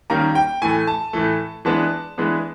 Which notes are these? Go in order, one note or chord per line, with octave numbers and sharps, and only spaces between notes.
D#3 G3 A#3 C#4 A#5
G5
A2 E3 A3 G#5
A5
A2 E3 A3
E3 G#3 B3 D4 A5
E3 G#3 B3 D4